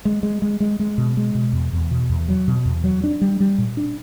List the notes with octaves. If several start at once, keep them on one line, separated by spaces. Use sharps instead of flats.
G#3
G#3
G#3
G#3
G#3
B2
G#3
B2
E2
E2
B2
E2
F#3
B2
E2
F#3
D4
G3
G3
A#2
D4